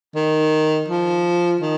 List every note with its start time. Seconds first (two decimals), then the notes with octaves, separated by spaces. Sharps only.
0.16 D#3
0.88 F3
1.61 D#3